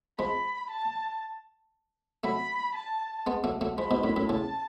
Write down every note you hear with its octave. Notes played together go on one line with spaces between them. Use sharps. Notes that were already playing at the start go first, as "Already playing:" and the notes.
F3 G#3 B5
A5
F#3 A3 B5
A5
G#3 B3
F#3 A3
F#3 A3
F3 G#3 B5
G#2 B2
F#2 A2
F#2 A2
A2 C#3 A5